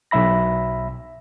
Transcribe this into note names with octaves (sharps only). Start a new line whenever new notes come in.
B1 F#3 E5 B5 A#6